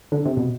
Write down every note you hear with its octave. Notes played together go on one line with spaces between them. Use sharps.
D3
C3
B2